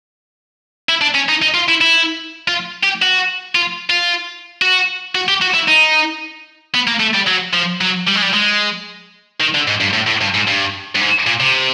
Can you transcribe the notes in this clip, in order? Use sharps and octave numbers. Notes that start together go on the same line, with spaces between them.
E4
D4
C#4
D#4
D#4
F4
E4
E4
F4
G4
F#4
F4
F4
F#4
F#4
G4
F#4
E4
D#4
B3
A#3
A3
G3
F#3
F3
F#3
G3
G#3
G3
G#3
D#3
D3
G#2
G2
A2
A2
G2
G#2
G2
G2
G#2
A#2
C3